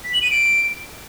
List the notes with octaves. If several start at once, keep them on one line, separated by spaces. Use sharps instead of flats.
B6
F#7
D#7
D7